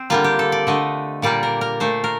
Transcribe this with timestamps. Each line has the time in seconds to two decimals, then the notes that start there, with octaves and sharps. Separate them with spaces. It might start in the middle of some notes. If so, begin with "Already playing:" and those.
Already playing: C4
0.10 D3 G3 A#3 F4
0.24 G4
0.39 A4
0.52 D5
0.67 D3 A3 D#5
1.22 A#2 G3 A#3 D5
1.43 A#4
1.61 A#4
1.80 A#2 A3 C5
2.04 A#4